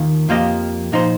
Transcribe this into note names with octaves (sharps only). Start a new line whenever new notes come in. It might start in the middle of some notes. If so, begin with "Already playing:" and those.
Already playing: D#2 D#3 A#3 F4
F2 F3 A#3 G4 D#5
A#2 F3 D#4 C5